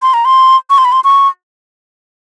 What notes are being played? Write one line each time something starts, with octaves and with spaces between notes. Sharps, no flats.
C6
A#5
C6
C#6
C6
B5
C6
C#6